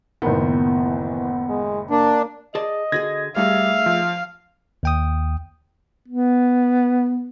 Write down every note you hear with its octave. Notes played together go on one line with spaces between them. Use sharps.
F#1 A2 D#3 B3
E3
G#3
A#3 D4
G#4 D5 D#5 A5
D3 F#4 G#4 G#6 A#6
G3 A3 D#4 G#4 E5 F5
F3
D#2 G5 D#6
B3